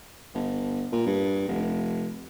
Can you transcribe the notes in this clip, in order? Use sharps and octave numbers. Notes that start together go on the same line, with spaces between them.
G1
A#2
G2
F1